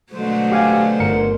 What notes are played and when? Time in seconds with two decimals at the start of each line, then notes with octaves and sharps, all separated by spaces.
0.12 B2 D3 F#3 G#3 A3 C5
0.52 G4 F5 G#5
1.00 G1 A#4 C#7